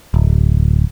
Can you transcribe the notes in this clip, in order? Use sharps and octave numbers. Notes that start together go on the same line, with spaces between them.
D1